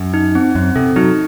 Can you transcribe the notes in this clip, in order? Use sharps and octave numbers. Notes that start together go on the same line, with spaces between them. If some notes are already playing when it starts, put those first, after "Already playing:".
Already playing: F#2
D#4
C4
F#2 C4
C3 A4
F#3 D#4